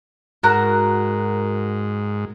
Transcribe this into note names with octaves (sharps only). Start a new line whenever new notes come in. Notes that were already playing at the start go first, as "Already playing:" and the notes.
G#2 F#4 A#4 F#6